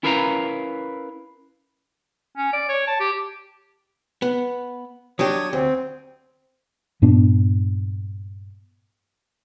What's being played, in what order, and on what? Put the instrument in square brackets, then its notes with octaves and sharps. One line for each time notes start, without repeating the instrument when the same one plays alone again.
[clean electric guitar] C#4 E4 A#4 B4 F5 A#5
[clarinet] C#4
D5
C#5
A5
G4
[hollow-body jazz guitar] B3
[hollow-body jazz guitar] F#3 D4 G4 [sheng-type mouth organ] C#5 D#6
[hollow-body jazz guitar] D2 [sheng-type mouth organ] C4
[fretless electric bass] G2 A#2 B3 D4